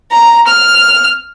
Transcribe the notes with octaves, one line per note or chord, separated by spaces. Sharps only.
A#5
F6